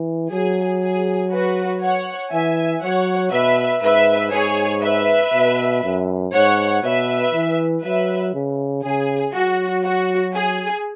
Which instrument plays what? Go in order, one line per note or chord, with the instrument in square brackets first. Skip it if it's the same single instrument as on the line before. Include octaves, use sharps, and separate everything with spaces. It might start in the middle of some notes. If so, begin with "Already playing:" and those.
Already playing: [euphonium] E3
[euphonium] F#3 [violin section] G#4
[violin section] G#4
F#4 B4
C#5 F#5
[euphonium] E3 [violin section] E5 G#5
[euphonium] F#3 [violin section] C#5 F#5
[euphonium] B2 [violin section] B4 E5
[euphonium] G#2 [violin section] B4 E5
[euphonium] G#2 [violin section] G#4 C#5
[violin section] B4 E5
[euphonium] B2
F#2
[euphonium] G#2 [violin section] C#5 F#5
[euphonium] B2 [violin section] B4 E5
[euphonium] E3
[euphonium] F#3 [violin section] B4 E5
[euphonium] C#3
[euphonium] C#3 [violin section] G#4
[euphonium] F#3 [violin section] F#4
[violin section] F#4
G#4